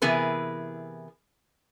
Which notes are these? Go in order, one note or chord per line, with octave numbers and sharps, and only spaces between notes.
C3 E3 B3 G#4 A#4 B4